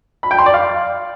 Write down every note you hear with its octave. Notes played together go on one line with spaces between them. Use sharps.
B5
G5
C6
D5
F5